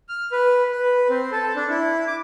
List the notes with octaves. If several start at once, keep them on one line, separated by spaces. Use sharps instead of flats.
F6
B4
B4
C4
A4
D4
E4
D6